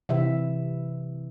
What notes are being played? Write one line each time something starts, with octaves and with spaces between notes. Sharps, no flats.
C3 E3 E5